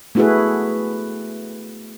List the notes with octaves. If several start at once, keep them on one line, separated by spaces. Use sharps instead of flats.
A3 B3 E4 F#4 G#4 B4